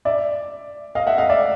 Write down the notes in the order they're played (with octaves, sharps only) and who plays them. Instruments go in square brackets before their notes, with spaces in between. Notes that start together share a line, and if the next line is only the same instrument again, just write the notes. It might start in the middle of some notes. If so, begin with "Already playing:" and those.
[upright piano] D5 E5
D#5 F5
E5 F#5
D#5 F5
D5 E5